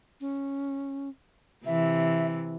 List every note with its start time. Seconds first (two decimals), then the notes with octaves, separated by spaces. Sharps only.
0.21 C#4
1.66 C3 E3 E5